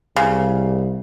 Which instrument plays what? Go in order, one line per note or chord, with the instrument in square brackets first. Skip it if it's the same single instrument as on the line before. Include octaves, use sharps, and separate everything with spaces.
[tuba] C2 [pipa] C#3